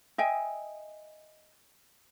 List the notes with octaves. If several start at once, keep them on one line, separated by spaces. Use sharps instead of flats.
D#5 E5 G5 G#5